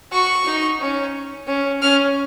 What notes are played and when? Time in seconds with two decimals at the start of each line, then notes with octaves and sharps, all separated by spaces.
0.12 F#4 C#6
0.46 D#4
0.80 C#4
1.47 C#4
1.82 C#4 F6